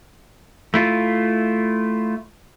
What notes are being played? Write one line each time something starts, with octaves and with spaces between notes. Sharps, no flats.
A3 E4 F4